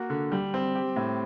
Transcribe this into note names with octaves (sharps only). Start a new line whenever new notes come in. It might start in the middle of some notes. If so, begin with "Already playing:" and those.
Already playing: A#3 F#4
D3
G3
C4
G4
A2